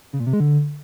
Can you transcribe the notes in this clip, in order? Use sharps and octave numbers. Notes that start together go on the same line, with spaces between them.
C#3
A#2
C3
G#3
D3